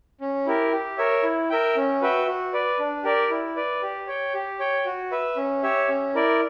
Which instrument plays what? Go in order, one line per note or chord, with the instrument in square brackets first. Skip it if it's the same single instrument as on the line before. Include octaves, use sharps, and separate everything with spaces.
[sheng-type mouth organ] C#4
E4 G4 A#4
G4
A#4 C#5 E5
E4
A#4 E5 G5
C#4
F#4 B4 E5 G5
F#4
B4 D5
D4
G4 A#4 D5
E4
B4 D5
G4
C#5 G5
G4
C#5 G5
F#4
B4 E5
C#4
G4 C#5 E5
C#4
E4 A#4 D5